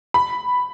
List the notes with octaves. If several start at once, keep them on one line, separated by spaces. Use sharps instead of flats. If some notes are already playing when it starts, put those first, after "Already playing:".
B5